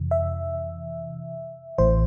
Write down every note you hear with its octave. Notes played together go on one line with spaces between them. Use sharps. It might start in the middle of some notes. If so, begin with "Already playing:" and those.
Already playing: F2 C3 E3
E5
A1 A2 E3 C5